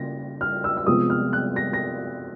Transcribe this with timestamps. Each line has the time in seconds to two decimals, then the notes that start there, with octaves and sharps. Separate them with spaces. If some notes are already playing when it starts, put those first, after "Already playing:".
Already playing: C#3 A#3 A#6
0.41 F6
0.64 E6
0.77 E6
0.86 C3 F3 G#3 B3 D#6
1.10 F6
1.33 F#6
1.56 A#6
1.73 A#6